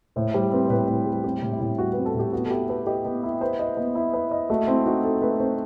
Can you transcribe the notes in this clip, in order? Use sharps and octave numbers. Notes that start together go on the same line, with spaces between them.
A2 C5
G3 C5
C4 B4
C5
A2 B4
A2
G3
C4 G4
A2
E4
A2
G3 F#4
C4 B4
A4
A2 G4
B3 F#4
A4
E4 G4
A4 B4
G4 D#5
B3
E4
B4 C5
D#5
B3
E4
B4
D#5
A3 F#4
C4 E4
D#4 F#4
A4
A3 B4
C4 C5